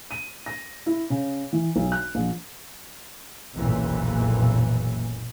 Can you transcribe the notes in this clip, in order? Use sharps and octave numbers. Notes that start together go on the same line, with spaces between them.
D#7
A#6
E4
C#3
E3
B1
F#6
A#1
F#1 B1 F2 A#2 E3